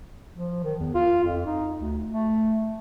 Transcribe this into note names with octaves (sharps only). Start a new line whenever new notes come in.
F3
D#3
E2
F4
F2
D#4
D2
A3